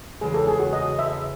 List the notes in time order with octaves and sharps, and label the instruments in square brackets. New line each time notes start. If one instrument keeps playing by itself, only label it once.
[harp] E2 C#3 G#3 [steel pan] G#4
[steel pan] A4
G#4
F#4
D#5
E5